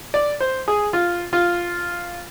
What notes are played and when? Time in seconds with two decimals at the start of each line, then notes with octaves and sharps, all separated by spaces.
0.14 D5
0.40 C5
0.68 G#4
0.93 F4
1.33 F4